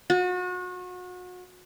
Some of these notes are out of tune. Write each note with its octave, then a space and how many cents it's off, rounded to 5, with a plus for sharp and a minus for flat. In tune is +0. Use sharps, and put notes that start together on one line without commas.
F#4 -35